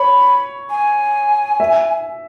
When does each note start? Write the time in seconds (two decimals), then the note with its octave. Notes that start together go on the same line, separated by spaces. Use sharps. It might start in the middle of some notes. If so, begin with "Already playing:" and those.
Already playing: C#5 B5
0.70 G#5
1.60 E5